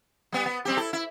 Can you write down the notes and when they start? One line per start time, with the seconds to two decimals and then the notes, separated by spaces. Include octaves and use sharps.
0.32 G3 B3
0.46 B3
0.65 G3 C4 G4
0.77 E4 A4
0.93 E4